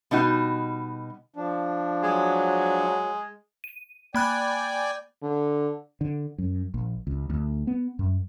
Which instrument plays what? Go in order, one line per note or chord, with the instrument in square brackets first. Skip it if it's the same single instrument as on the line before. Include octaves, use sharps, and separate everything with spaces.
[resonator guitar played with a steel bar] B2 G3 D#4 F#4
[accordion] F3 D4
[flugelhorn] F#3 [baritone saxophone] G#3
[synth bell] D#7
[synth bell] A#3 B5 F#6 [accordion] D5 G5 G#5
[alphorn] D3
[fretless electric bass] D3
F#2
A#1
C#2
D2
B3
F#2